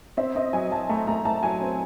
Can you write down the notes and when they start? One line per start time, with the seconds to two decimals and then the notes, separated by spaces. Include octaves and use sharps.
0.17 C4 E5
0.35 C4 D#5
0.53 F#3 G#5
0.71 F#3 A5
0.89 A3 A#5
1.07 A3 A#5
1.25 A3 A5
1.43 F#3 G#5
1.61 C4